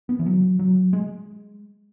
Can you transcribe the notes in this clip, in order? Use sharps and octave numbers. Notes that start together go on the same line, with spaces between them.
B3
E3
F#3
F#3
G#3